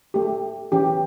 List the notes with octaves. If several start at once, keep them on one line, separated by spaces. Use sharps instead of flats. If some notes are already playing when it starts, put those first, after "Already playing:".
A3 G4
E3 C#4 G4